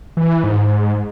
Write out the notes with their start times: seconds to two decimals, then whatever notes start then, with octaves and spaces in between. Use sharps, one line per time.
0.17 E3
0.44 G#2